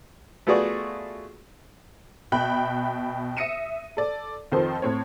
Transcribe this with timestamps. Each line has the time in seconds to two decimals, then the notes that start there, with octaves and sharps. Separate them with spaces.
0.47 A3 B3 F4 F#4 G#4 D5
2.32 B2 E5 G5 B5 F#6
3.37 E5 D#6 A#6 C#7 D#7 E7
3.97 A4 D5
4.52 F2 D#3 F3 A4 C5
4.82 A2 C4 C#5